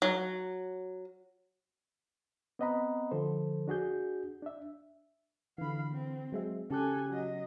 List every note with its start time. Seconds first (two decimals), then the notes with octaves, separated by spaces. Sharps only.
0.02 F#3
2.59 B3 C4 D#5 F#5 A#5 B5
3.11 D3 F3 A4 C5
3.67 D4 F#4 G#4 G6
4.42 D4 E5
5.58 D3 E3 F5 B5
5.91 C4
6.32 F#3 G#3 E5
6.70 C#3 C#4 G4 A4 G#5 F#6
7.10 F#3 D#5